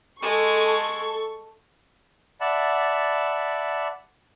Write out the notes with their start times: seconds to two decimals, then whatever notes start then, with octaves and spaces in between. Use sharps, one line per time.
0.22 G#3 A4 C#6
2.41 D5 E5 F#5 A5 B5